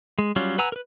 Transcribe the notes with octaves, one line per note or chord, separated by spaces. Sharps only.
G#3
F#3 G3 C#4 F4
B4 F#5 G#5 A#5 E6
A#4 B4